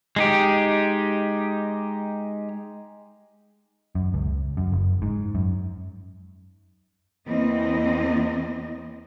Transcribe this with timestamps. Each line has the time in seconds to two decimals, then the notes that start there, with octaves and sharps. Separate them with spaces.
0.16 G#3 D#4 G4
3.95 F#2
4.14 C#2
4.57 F#2
4.72 F#1
5.02 G#2
5.35 F#2
7.27 E2 E3 A#3 C4 D#5